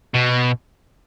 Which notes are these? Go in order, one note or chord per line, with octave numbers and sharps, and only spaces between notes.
B2